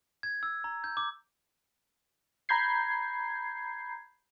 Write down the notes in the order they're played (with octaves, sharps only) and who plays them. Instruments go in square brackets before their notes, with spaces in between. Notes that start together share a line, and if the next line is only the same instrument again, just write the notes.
[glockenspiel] G#6
E6
A#5
G6
D6
[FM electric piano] A#5 B5 G6 G#6 C7